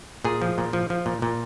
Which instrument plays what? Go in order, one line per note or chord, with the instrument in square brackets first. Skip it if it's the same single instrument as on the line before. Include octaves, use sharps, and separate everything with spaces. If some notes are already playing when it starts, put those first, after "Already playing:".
[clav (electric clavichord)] A#2 G#4
F3
A#2
F3
F3
A#2
A#2